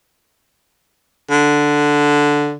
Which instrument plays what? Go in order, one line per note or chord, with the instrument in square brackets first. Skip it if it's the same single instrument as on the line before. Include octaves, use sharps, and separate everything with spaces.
[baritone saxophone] D3